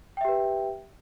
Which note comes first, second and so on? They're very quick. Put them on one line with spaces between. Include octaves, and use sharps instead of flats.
G5 E5 G4 B4